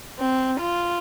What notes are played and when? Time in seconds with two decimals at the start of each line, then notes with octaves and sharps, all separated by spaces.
0.19 C4
0.59 F4